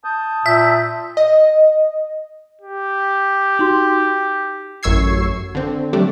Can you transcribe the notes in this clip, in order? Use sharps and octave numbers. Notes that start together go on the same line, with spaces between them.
A5 D#6 G6
A#2 E5
D#5
G4
D#4 F#4 C6
A1 F#2 C#6 E6 G#6 C7
D3 C4
F#3 G3 A3 D4